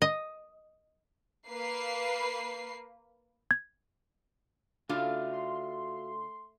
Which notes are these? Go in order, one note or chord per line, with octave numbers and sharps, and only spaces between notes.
D#5
A#3 B4 C7
G#6
C#3 A3 D4 F4 F#4 F5
C6